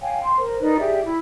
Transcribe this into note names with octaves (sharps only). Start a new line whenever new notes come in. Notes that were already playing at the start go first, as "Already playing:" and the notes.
C#5 F5 G5 G#5
C6
A#4 C5
D#4 A#4 B4 D5
G4 G#4 D5 E5
E4